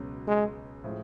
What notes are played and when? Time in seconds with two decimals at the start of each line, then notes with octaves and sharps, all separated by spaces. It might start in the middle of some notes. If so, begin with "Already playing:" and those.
Already playing: C#2 B2 F#3 C#4
0.28 G#3
0.84 A2 F3 G#3